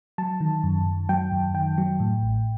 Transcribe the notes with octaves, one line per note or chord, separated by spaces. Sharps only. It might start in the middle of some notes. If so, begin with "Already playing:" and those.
F#3 A5
D#3
F#2
F#2
F#3 G5
F#2
D#3 G5
F#3
A2
A1